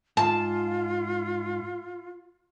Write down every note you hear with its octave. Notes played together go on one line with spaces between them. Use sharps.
G#2 F4 A5